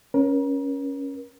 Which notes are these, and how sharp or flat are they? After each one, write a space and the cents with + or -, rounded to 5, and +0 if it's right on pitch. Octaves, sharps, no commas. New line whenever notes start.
C#4 +0 A#4 +35